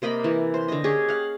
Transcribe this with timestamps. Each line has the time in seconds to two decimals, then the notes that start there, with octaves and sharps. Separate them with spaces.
0.02 C3 A#3 D#5 B5
0.24 E3
0.54 C5
0.68 D3 D#5
0.84 C#4 G4 G#4
1.08 F5 F#5